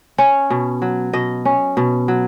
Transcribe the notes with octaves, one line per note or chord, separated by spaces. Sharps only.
C#4 C#5
B2
F#3
B2 D#5
C#4
B2
F#3